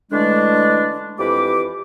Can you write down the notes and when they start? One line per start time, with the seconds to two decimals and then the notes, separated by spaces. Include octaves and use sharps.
0.11 D3 E3 G#3 A3 D4
1.19 F2 E3 G4 B5 D6